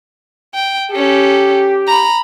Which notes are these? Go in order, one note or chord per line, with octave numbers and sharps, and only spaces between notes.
G5
C#4 G4 A4
A#5 B5